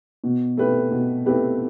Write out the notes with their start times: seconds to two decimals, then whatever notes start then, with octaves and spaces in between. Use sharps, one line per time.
0.24 B2
0.57 A3 C4 G4 B4
0.91 B2
1.26 A3 C4 G4 B4